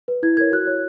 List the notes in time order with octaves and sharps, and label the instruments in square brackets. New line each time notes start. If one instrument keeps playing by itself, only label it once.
[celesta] B4
E4 G#6
A#4 C#5 G#6
F#4 F#6
C#5